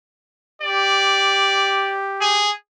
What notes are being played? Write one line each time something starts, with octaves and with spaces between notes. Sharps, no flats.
G4 D5
G#4